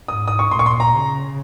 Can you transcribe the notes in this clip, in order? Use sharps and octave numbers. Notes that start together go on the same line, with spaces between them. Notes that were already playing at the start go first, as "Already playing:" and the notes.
G#2 D#6
D#6
C#6
A#2 C6
C#6
C6
A#5
C#3